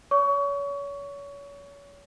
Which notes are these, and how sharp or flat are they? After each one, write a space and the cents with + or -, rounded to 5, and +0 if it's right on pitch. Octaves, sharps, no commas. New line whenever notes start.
C#5 +35 C#6 +25